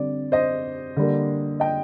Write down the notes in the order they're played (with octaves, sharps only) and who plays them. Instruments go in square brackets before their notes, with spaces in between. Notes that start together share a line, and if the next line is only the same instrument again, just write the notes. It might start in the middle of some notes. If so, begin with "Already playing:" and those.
Already playing: [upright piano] D3 G3 C4 D5
C5 D#5
D3 G3 A#3
D#5 G5